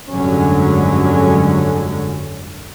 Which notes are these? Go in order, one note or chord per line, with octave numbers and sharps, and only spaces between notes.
F1 G2 D3 F#3 G#3 C#4